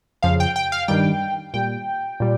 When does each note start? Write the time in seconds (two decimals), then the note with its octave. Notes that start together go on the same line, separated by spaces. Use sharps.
0.23 F2 C#3 F3 F5
0.40 G5
0.56 G5
0.72 F5
0.88 G2 D#3 G3 G5
1.54 A#2 G3 G5
2.20 A#2 G3